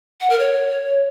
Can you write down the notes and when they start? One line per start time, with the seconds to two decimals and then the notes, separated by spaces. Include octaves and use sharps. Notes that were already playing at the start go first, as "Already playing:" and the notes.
0.20 F#5
0.30 A#4
0.39 C#5